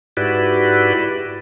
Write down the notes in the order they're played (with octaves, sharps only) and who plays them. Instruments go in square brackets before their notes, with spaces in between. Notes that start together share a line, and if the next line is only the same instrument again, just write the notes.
[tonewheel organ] G#2 E4 F#4 G4 B4 D5